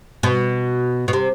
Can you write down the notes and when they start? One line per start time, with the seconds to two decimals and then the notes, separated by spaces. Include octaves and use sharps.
0.23 B2
1.08 B2
1.13 C3